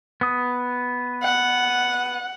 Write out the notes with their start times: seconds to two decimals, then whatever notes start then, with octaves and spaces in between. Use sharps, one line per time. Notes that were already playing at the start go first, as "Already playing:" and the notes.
0.21 B3 D#6
1.23 F#5